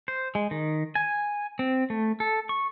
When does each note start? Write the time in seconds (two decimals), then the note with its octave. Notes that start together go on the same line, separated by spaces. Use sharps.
0.08 C5
0.35 G#3
0.51 D#3
0.95 G#5
1.59 C4
1.90 A3
2.20 A4
2.49 C#6